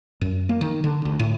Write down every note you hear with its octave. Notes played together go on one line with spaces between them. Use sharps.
F#2
A#3
D#3
D3
D2
A2